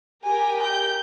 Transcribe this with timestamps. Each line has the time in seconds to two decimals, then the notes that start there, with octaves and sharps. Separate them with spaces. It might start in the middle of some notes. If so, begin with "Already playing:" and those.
0.24 G4 A#4 G5 G#5
0.61 G6